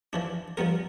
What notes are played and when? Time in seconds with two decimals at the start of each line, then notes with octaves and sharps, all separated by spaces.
0.13 E3 F3 D4
0.57 F3 G3 B3 A#4